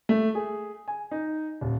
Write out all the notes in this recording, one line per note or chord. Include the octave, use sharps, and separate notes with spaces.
A3
G#4
G#5
D#4
D#1